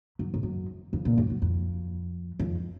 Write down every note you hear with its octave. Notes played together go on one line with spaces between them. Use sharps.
F#2
G#2
F#2
F2
A#2
F#2
F#2
F2
F2